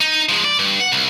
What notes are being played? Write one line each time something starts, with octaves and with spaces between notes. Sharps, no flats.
D#4
F3 G#3
D5
G2
F#5
C2